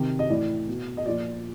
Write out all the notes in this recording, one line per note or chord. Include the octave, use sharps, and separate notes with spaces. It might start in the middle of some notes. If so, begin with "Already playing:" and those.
Already playing: C3 D#3
D#5
A2 E3 D5
B2
D#5
A#2 F3 D5